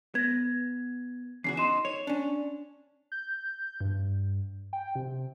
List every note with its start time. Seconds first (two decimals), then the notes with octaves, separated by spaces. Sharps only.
0.15 B3 G#6 A#6
1.44 E2 C#3 F#4 C7
1.57 D#4 C6 E7
1.85 C#5 F7
2.07 C#4 D4
3.12 G6
3.81 G2
4.73 G5
4.95 C3